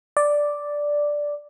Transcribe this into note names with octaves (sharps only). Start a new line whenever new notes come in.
D5